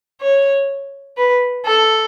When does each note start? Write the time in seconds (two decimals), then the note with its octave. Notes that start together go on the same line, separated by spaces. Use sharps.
0.21 C#5
1.17 B4
1.66 A4